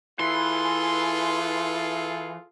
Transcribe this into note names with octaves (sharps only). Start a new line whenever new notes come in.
E3 F4 G#4 A4 C6